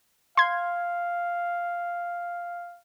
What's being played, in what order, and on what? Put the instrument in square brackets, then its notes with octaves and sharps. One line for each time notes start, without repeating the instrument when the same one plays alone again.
[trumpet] F5 [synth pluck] C6 G#6